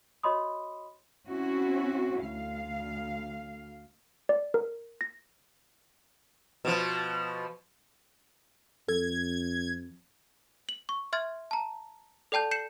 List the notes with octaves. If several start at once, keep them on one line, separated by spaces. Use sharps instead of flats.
F#4 C#5 D#5 B5 C6 D#6
C4 C#4 E4 F#4
D2 F5
D5
A#4
A#6
B2 F3
F2 A4 G#6
F#7
C#6
E5 C6 F6 G#6 A6
A5 A#5
A4 D5 G5 A5 G6
G6 C7 C#7 E7